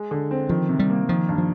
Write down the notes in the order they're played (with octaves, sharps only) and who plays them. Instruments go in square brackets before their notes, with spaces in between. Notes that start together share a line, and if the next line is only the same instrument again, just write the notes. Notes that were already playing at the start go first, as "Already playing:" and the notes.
Already playing: [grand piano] G#3
D3
C4
[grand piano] D#3 [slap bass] F3
[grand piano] C3
[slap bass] G3
[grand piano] A#3
[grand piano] D#3 [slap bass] F3
[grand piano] G2
[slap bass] F3